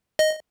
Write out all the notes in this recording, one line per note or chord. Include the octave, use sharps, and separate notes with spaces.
D#5